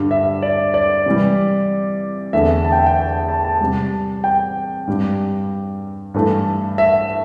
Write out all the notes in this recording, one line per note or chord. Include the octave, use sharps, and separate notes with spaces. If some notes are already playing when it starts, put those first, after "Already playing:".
Already playing: G2 D3 G3
E5
D5
D5
C3 E3 G3
E2 D3 A3 E5
A5
G5
E5
G5
G5
A5
A5
C3 G3
G5
G2 G3
G2 E3 A3
E5